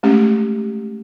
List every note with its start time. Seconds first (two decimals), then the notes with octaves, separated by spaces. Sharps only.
0.03 G#3 A3 C#4 G4